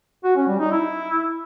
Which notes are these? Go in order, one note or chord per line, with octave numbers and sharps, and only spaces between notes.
F#4
C#4
G3
D#4
E4